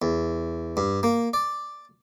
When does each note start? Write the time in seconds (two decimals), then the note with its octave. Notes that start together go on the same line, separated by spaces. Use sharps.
0.02 E2
0.77 G2
1.03 A#3
1.33 D5